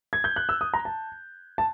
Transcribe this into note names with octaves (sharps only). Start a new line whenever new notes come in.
G#6
G6
F#6
E6
D#6
A#5
A5
A5